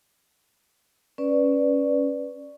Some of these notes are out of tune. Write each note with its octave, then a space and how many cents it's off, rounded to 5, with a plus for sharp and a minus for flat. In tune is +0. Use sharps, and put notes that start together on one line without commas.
C#4 +0 B4 +0 D5 +0